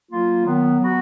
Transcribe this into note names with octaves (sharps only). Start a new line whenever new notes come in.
F#3 A#3 F4
D#3 F#3 B3
F#3 B3 F#4